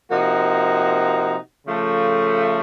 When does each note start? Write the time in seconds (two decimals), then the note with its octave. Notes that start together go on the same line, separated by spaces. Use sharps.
0.10 C3 F3 A#3 D#4 F#4
1.67 C#3 F3 A3